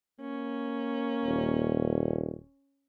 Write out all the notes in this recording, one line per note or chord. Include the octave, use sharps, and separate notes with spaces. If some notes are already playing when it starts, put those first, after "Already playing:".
A#3 C#4
D#1